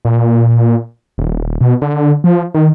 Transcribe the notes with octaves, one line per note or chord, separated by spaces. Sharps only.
A#2
D#1
B2
D3
F3
D#3